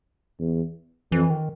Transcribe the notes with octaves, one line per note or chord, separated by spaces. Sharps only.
E2
F2 E3
D#3